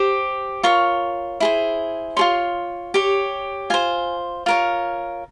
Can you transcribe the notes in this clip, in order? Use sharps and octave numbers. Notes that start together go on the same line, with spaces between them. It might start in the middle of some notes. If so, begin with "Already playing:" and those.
Already playing: G4 C5
F4 A#4 C#5 C#6
E4 G#4 C5
F4 G#4 C#5 C6
G4 C#5
F4 C5 G#5
F4 A#4 C#5